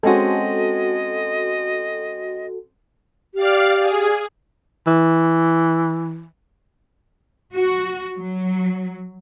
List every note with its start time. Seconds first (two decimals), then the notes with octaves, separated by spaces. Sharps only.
0.03 G#3 C4 C#4 F#4 A4 D#5
3.35 G4 D5 F5
3.79 G#4
4.87 E3
7.54 F#4
8.17 F#3